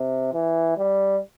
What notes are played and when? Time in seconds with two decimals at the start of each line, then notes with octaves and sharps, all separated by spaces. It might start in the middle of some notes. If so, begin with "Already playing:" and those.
Already playing: C3
0.33 E3
0.77 G3